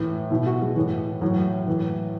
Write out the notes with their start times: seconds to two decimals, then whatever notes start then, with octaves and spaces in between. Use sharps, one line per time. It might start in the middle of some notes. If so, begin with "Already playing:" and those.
Already playing: A2 E3
0.31 B2 E4
0.46 F#4
0.62 G#3
0.76 A2 E3
1.21 A2 E3 F#3
1.67 A2 E3